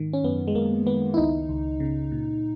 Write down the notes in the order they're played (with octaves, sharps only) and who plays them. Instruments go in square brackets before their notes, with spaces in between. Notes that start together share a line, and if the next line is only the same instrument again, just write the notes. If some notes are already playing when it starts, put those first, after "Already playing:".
Already playing: [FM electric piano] G#2 D#3
C#4
F#2 B3
G#3
F#2 A#3
D#3 B3
E4
C#2 D#4
C#2
C#3
A#2